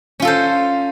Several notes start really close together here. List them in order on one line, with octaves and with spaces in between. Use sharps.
C#4 F4 A4 C5